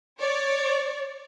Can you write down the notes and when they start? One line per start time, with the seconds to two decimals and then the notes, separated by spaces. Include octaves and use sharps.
0.20 C#5 D5